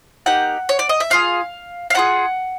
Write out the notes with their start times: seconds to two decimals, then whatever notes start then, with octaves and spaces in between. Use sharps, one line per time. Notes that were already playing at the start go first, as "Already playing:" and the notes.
0.26 A#3 D#4 G4 F#5
0.69 C#5
0.79 D5
0.89 D#5
1.00 E5
1.10 D4 F4 G#4 F5
1.90 F5
1.95 D4 F4 G#4 F#5